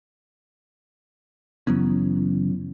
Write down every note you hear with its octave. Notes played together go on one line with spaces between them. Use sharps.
F#2 C#3 E3 F#3 B3 C#4